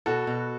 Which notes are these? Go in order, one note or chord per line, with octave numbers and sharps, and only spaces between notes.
B2 F#4 A4
B2